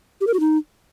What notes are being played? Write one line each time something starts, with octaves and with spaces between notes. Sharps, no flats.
G4
A#4
F#4
D#4